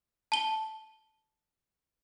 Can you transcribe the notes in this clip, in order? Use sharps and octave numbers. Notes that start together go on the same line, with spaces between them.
A5 G7